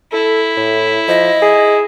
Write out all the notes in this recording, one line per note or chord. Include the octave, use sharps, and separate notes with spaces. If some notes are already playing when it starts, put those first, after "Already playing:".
E4 A4
A2
F3 D#5
G#4